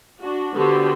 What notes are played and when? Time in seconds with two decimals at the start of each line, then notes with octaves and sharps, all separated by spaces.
0.21 D4 F#4
0.56 D3 B3 F#4 G4 C5